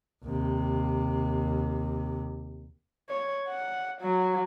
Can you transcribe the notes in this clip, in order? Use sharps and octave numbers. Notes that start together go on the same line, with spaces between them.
D#2 C3
C#5
F#5
F#3